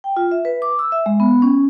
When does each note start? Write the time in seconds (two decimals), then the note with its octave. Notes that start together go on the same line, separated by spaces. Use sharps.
0.04 G5
0.17 F4
0.31 E5
0.45 B4
0.62 D6
0.79 E6
0.92 E5
1.06 G#3
1.20 B3
1.42 C#4